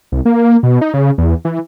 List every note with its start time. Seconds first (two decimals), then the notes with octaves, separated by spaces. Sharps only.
0.12 C2
0.25 A#3
0.63 B2
0.81 D#4
0.94 C#3
1.18 E2
1.45 E3